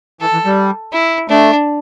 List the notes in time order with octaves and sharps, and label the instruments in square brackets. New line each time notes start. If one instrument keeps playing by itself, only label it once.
[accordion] E3 [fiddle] A4
[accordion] E3
G3
[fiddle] E4
[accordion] A3 [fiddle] D4